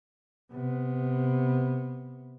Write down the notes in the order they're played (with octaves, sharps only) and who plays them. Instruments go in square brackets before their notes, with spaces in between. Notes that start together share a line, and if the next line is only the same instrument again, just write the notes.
[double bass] C3 B3